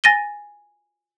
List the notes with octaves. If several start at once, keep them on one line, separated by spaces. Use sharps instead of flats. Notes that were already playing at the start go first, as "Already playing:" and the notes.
G#5 A6 A#6 D#7 G7